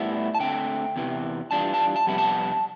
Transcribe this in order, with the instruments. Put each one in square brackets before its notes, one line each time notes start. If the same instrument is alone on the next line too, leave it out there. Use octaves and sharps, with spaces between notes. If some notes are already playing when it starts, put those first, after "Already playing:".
Already playing: [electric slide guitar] A2 G3 B3 E4
A5
D3 A3 C4 G5
E2 C3 E3
E3 G3 D4 F4 A5
A5
A5
F2 C3 G3 B3 E4
A5